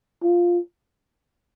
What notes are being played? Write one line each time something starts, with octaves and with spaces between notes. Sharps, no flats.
F4